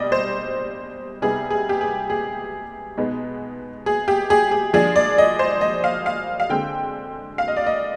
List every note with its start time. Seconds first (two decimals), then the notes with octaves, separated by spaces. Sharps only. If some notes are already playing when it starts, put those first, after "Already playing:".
Already playing: B2 G3 D4 D5 D#5
0.12 C5
1.22 C3 G3 B3 D#4 G#4
1.50 G#4
1.69 G4
1.81 G#4
2.10 G#4
2.97 B2 G#3 B3 D#4
3.86 G#4
4.08 G4
4.30 G#4
4.51 G#4
4.73 F3 G#3 D4 G#4
4.96 D5
5.18 D#5
5.39 C5
5.61 D#5
5.84 F5
6.06 F5
6.40 F5
6.49 D3 G#3 C4 G5
7.38 F5
7.48 D#5
7.57 D5
7.67 D#5